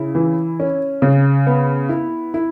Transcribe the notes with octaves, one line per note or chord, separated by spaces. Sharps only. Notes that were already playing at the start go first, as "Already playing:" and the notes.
Already playing: C#3 E4
E3
C#4
C#3
B3
E4
E4